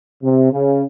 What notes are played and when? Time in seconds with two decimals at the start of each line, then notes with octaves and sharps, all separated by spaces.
0.23 C3
0.52 C#3